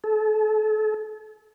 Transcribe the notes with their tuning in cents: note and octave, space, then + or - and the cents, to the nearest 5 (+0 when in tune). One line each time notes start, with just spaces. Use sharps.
A4 -35